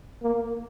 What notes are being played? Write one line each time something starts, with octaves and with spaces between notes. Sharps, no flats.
A#3